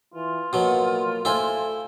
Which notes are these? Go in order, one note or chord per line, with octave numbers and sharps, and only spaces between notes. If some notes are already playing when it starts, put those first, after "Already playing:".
E3 F4
B2 F#3 A#3
A3 E4 C5 D5 F5 G#5